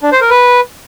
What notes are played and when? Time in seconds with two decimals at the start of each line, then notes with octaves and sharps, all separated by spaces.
0.03 D4
0.12 C5
0.21 A#4
0.30 B4